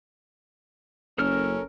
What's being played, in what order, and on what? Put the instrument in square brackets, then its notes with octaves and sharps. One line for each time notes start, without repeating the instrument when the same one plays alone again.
[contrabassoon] F#1 [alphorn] C#4 [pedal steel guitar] A4 A#4 F6